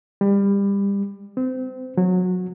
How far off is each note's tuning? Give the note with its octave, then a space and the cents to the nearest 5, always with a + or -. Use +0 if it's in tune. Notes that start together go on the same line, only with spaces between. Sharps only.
G3 +25
C4 -25
F#3 -20